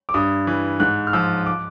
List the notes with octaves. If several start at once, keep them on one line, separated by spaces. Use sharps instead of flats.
D6
G2 D#6
E3
G#2 F#6
F6
F3 E6
D6